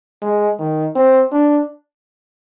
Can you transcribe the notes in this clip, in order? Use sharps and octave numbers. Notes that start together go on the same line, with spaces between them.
G#3
D#3
C4
D4